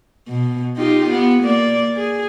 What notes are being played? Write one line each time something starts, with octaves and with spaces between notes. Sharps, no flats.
B2
D#4 F4 G4
B3
A#3 D5
G#4